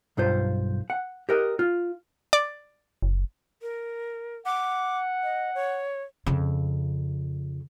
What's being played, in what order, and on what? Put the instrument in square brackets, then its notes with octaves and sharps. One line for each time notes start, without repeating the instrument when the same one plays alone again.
[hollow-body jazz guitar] B1 G2 F4 C5
F#5
G4 A#4 D#5
F4
[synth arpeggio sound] D5
[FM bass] F#1
[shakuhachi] A#4
[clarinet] F#5 [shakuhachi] D6
[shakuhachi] D#5
C#5
[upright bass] F2 C#3